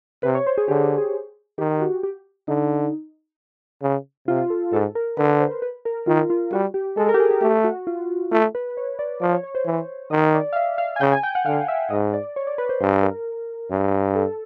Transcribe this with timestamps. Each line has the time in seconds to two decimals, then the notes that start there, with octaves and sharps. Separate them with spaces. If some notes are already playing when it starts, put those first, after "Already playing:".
0.23 C3 B4
0.35 C#5
0.46 C5
0.58 G#4
0.68 D3 G4
0.84 G4
0.98 G#4
1.58 D#3 G4
1.81 F#4
2.03 G4
2.48 D3 D#4
3.82 C#3
4.28 C3 F4
4.50 A4
4.72 G#2 A4
4.95 A#4
5.17 D3 B4
5.40 C5
5.62 B4
5.85 A#4
6.07 D#3 F4
6.30 F4
6.52 G3 F#4
6.74 G4
6.96 G#3 A4
7.09 A#4
7.14 G4
7.20 G#4
7.31 G4
7.42 A3 G4
7.64 F#4
7.87 F4
8.32 A3 F4
8.55 B4
8.77 C#5
8.99 D5
9.22 F3 D5
9.32 C#5
9.43 C#5
9.55 C5
9.66 E3 C5
10.11 D#3 D#5
10.34 D5
10.53 F5
10.56 E5
10.78 F5
10.96 G#5
11.01 C#3 G5
11.12 G#5
11.23 G5
11.35 F#5
11.46 D3 F5
11.68 E5
11.90 G#2 D#5
12.13 D5
12.36 C#5
12.47 D5
12.58 B4
12.69 C5
12.80 G2 C5
13.03 A#4
13.71 G2
14.15 A4